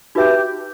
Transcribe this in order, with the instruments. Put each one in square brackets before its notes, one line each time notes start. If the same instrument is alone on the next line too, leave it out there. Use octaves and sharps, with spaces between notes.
[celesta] D#4 F#4 B4 E5 A5 [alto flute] G4